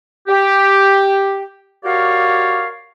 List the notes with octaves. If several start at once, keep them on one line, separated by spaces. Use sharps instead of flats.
G4
F#4 G4 A#4 C#5 D5 F5